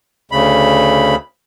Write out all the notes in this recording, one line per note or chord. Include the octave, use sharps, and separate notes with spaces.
D2 C#3 B5